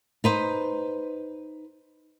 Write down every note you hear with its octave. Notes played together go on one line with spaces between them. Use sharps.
D#4 B4 C5